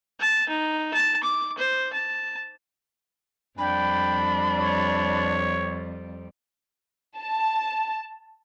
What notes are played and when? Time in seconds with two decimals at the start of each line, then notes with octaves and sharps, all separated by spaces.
0.20 A5
0.49 D#4
0.93 A5
1.23 D6
1.58 C5
1.93 A5
3.58 F2 G3 D4 G5 B5
4.57 C#5
7.19 A5